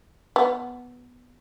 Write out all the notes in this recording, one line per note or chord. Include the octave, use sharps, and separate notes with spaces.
B3